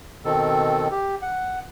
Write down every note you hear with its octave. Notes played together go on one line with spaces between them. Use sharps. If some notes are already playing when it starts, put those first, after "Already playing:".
B2 D#3 C4 A4
G4
F#5